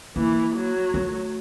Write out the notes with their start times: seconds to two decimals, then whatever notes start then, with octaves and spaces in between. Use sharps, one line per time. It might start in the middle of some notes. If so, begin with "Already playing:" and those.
0.16 E3 A#3
0.55 F#3
0.94 A3